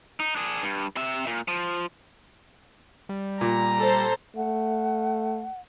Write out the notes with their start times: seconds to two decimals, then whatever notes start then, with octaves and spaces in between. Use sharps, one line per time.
0.20 D#4
0.36 D4 G#4
0.62 G2
0.96 C3 E5
1.27 A#2
1.48 F3
3.09 G3
3.41 A#2 A#5
3.79 A4 C5
4.37 A3 F#5